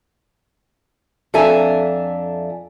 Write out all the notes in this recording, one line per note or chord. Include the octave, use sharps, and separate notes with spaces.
F2 D4 A4 E5 G#5 A#5